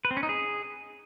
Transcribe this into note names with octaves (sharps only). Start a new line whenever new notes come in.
B4
C4
C#4
D#4
G#4